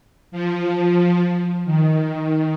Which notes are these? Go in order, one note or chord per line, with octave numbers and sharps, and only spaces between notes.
F3
D#3